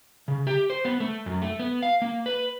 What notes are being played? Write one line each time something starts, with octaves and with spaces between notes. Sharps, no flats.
C#3
G4
C5
B3
A3
F#2
A3
B3
F5
A#3
B4